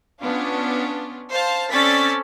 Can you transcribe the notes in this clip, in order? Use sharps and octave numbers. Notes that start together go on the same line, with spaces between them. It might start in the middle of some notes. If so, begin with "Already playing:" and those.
B3 C#4 D4 F4
C5 F5 A5
C4 C#4 A4 D5 A6 B6